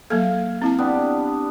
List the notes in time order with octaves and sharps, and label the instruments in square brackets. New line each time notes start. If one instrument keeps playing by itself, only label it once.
[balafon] F#3 A#3 A4 [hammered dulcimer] F5
[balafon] C4 E4 A5
[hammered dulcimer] B3 D4 G4